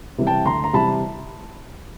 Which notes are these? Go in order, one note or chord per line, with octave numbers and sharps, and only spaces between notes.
C3 E3 G3
G5 A5
D2 A#5 C6
A#5
C3 E3 G3 A5 B5